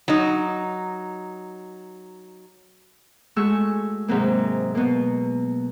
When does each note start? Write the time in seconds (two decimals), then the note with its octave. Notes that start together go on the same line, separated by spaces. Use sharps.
0.08 F#3 D#4
3.36 G#3 A3 F#4 G#5 C#6 E6
4.08 G#2 C3 F#3 A#3
4.75 B2 A#3